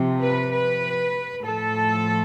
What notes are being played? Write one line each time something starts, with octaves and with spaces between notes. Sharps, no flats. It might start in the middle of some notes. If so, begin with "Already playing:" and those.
Already playing: C3 F3
B4
B4
A2 F3 A4